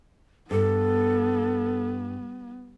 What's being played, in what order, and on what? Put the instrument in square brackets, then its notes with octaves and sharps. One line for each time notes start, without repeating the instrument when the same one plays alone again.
[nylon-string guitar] G2 [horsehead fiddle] B3 [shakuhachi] A4